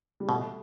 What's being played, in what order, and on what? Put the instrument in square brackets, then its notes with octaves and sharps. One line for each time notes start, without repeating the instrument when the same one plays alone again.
[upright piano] G3
[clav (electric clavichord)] B2 [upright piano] A3